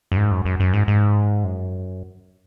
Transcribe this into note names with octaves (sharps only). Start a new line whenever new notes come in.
F#2
G#2
F#2
F#2
F#2
G#2
G#2
F#2